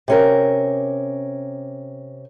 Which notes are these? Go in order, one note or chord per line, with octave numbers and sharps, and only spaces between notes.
C3 C#4 A#4